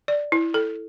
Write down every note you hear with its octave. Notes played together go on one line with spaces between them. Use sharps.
D5
E4
A4